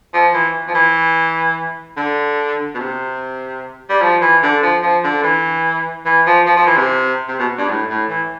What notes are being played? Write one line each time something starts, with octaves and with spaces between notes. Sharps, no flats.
F3
E3
F3
E3
D3
B2
C3
G3
F3
E3
D3
F3
F3
D3
E3
E3
F3
F3
F3
E3
C3
C3
B2
G2
A2
A2
E3